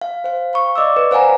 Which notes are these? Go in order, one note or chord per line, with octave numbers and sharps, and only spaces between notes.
F5
C5 F5
F5 B5 C#6
D5 D#5 D6 E6
B4 D5
C5 F5 F#5 G#5 A#5